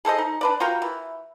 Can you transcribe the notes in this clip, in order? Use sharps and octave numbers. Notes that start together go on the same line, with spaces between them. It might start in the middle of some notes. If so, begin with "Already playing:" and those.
G#4 A4 C5 D#5
D#4
D4 B4 D5
F4 F#4 A#4 G5
E3